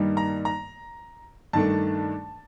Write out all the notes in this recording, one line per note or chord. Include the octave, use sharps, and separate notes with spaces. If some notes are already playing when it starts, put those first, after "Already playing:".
Already playing: G2 D#3 G3 A#3
A#5
A#5
G2 D#3 A3 D4 A5